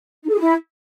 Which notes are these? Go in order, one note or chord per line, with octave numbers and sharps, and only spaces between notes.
D#4
A4
G#4
E4